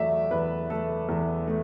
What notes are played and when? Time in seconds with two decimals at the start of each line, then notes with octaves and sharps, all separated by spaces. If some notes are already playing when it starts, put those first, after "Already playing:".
Already playing: E2 F#3 A3 D5 E5
0.31 E2 B4
0.70 A3 A4
1.09 E2
1.48 A3